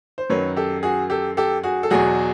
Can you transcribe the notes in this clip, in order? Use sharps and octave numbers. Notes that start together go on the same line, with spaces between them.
C5
F#2 D#3 F#3 B4 C#5
G4 A4
F#4 G#4
G4 A4
G4 A4
F#4 G#4
A4
E2 B2 F#3 F#4 G#4